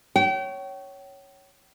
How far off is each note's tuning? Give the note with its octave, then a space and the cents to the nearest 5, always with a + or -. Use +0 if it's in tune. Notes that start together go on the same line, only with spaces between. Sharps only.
C#5 +0 G5 -35